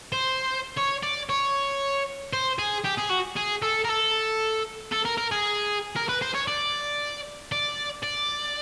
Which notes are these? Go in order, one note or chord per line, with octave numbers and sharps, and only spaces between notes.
C5
C#5
D5
C#5
C5
G#4
G4
G#4
F#4
G#4
A4
A#4
A4
A4
A#4
A#4
G#4
A#4
B4
C5
C#5
D5
D5
D5